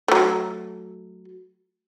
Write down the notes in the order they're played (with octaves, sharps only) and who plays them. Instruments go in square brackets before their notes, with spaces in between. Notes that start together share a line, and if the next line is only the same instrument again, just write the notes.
[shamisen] F#3 A3